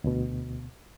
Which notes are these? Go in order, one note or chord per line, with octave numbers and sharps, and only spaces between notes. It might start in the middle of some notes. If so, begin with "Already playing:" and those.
D2 B2